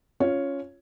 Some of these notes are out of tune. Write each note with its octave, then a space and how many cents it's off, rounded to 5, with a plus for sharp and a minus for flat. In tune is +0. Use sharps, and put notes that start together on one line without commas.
C#4 +0 F4 +0 C#5 +0